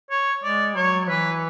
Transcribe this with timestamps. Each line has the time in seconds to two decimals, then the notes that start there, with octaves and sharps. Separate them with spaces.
0.10 C#5
0.43 G#3 D5
0.76 F#3 C#5
1.08 E3 B4